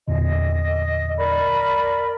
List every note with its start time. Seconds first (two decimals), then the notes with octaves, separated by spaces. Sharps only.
0.08 E2 A#2 D3 D#5
1.17 A#4 D5 B5